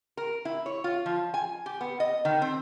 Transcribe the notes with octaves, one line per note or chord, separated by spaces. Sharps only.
A#4
E4
C#5
F4
F3
G#5
G4
B3
D#5
D#3
C4